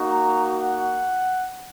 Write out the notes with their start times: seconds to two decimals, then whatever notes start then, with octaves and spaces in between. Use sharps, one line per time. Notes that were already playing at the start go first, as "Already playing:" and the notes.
Already playing: A#3 D#4 F#4
0.12 A#5
0.55 F#5